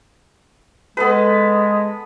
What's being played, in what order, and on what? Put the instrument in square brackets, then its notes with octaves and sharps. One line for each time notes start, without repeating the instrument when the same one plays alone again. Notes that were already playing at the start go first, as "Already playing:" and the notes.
[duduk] G#3 [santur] B3 A4 B4